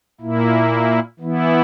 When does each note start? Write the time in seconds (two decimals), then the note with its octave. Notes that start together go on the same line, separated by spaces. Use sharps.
0.21 A#2 A#3 E4
1.20 E3 B3 E4